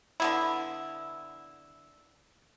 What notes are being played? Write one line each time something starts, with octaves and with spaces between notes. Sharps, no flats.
D3 B3 E4